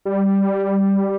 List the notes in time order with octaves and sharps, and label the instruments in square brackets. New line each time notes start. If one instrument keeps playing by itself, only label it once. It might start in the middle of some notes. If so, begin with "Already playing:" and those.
[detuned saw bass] G3